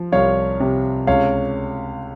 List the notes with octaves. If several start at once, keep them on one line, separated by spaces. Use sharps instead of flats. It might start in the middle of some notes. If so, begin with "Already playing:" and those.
Already playing: F3
C2 C#5 F5
C3
C#2 C#5 F5